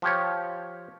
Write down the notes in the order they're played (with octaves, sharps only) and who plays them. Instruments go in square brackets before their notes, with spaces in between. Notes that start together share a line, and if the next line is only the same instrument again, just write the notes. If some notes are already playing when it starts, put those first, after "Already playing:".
[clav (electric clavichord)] F3 G4 C#5